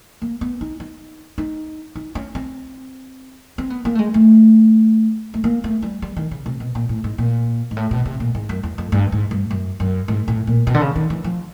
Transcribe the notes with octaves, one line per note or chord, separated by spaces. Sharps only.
A#3
B3
D#4
D#4
D#4
D#4
C#4
C4
C4
B3
A#3
A3
G#3
A3
A3
A#3
A3
G3
G3
D#3
C#3
C3
B2
A#2
A2
G#2
A#2
G#2
A2
B2
C3
A#2
G#2
F#2
E2
F2
G2
G#2
G2
F#2
F#2
G#2
A2
A#2
B2
D3
C#3
D#3
E3
F3